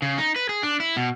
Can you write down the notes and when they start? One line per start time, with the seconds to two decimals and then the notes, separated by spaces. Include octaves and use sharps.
0.02 C#3
0.18 D#4
0.36 B4
0.49 G#4
0.63 D4
0.80 E4
0.96 B2